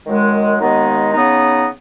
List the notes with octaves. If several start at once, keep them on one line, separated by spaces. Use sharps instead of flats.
F#2 D#3 G#3
D#2 D#3 G#3 B3 D#4
C#3 B3 D#4